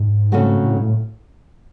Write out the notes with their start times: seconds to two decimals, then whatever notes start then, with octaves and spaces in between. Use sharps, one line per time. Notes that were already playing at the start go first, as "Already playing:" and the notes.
Already playing: G#2
0.32 C#3 F#3 A3 C4 F#4
0.64 A2
0.72 G#2
0.80 A2